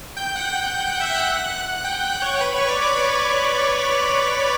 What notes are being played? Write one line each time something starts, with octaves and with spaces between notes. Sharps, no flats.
G5 G6
F#5 F#6
G5 G6
F#5 F#6
E5 E6
F#5 F#6
G5 G6
F#5 F#6
C#5 C#6
B4 B5
C#5 C#6
D5 D6
D5 D6
B4 B5